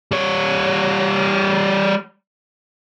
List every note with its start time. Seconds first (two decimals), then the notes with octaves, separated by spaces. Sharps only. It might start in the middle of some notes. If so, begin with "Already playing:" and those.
0.11 G3 C#5